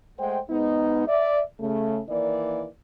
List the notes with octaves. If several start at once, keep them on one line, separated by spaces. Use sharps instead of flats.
G#3 A3 C5 F#5 G5
G#2 B3 D#4
D5 E5
C#3 A3
D#3 E3 A#3 D5